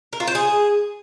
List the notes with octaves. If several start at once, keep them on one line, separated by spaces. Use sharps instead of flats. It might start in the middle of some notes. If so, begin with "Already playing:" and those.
A#4
F4
C5
G#4